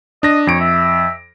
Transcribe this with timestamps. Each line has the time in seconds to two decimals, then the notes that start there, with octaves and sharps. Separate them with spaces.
0.23 D4 D#5 A#6
0.47 F2 C#5 D7
0.60 E5